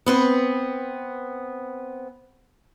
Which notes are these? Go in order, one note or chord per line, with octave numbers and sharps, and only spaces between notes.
B3 C4 B4